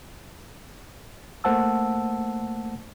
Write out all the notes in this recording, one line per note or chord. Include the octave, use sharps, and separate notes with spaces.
A3 A#3 C5 F#5 A5 E6